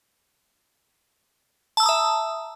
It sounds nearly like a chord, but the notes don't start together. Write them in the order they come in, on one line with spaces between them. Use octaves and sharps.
A5 E6 A#5 D#6 E5